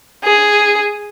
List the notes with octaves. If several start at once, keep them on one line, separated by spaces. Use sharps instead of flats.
G#4